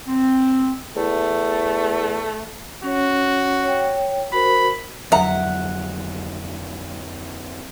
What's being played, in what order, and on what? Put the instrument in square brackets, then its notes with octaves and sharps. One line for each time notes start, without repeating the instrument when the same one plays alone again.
[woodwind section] C4
[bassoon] E2 [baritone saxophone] A3
[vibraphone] C#4 C#5 [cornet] F#4
[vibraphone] C#5 G5
[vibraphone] F#4 A#4 C5 [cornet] B5
[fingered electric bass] F2 D3 F#3 [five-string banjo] E5 A#5 [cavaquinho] F#5